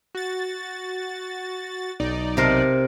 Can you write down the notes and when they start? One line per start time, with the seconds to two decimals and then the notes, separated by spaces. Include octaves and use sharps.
0.15 F#4 A6
2.00 B1 D#4 D5
2.37 C3 A#4 C5